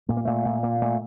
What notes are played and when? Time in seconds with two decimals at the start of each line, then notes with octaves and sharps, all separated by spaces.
0.09 A#2 A3
0.17 A#3
0.25 A#2 A3
0.46 A#2
0.63 A#2 A#3
0.81 A#2 A3